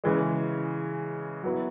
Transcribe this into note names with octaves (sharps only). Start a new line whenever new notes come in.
C#3 E3 G#3
F#3 B3 E4